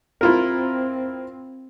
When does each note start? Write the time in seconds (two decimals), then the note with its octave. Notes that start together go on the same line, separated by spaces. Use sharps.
0.21 C4 E4 F4 A#4